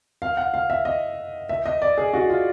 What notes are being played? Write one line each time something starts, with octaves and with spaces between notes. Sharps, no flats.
F5
F#5
F5
E5
D#5
E5
D#5
D5
G#4
F#4
F4